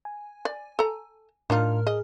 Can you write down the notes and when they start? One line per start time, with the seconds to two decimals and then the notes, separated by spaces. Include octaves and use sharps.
0.05 G#5
0.45 D5
0.79 A4 A#5
1.50 A2 D4 D#4 F4 A#4 F6
1.87 G#4 D#5